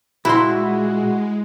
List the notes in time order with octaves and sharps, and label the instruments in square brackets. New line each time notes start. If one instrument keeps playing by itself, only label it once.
[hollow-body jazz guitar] A#2 A#4 C6 [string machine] G#3 [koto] E4 [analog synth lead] F#4